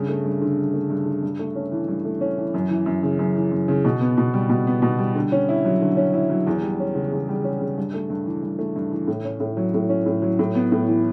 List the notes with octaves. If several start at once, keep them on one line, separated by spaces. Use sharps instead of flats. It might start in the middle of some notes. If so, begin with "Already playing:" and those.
Already playing: G2 C#3
A3
G2
D3
G2
A3
G2
D3
G2
A3
C#4
E3
G2
A3
C#4
E3
F#2
E3
F#2
C#3
F#2
E3
F#2
C#3
B2
B3
B2
G3
B2
B3
B2
G3
D3
C#4
E4
F#3
D3
C#4
E4
F#3
E2
G3
C#4
C#3
E2
G3
C#4
C#3
G2
A3
G2
E3
G2
A3
G2
E3
A2
C#4
A2
F#3
A2
C#4
A2
F#3
A2
B3
A2
E3